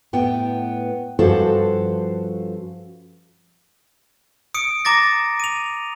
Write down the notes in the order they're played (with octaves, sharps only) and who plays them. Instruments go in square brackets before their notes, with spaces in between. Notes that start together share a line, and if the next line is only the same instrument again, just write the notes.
[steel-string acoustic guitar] A2 B3 G5
G2 F3 C#4 F#4 A4 C5
[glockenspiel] D#6 C#7 D7
A#5 D6 A6 A#6
D#7 F7